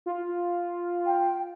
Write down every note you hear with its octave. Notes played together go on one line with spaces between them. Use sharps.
F4
G5